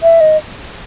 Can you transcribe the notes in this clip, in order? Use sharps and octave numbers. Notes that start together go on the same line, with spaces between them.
E5
D#5